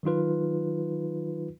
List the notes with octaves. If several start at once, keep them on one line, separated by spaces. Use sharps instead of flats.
D#3 F#3 D#4 F4 B4